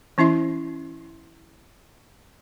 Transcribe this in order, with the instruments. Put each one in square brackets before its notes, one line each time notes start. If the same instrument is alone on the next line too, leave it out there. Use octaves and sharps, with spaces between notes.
[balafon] E3 C#4 E4 E5 C6